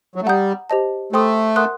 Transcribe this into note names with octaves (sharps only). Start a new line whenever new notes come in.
F#3
A3
G3 F#5 A#5 D#6 G6
G4 C5 D#5 A5
A3 C5 G5 C6 D#6
A#4 F#5 C6 D#6 F#6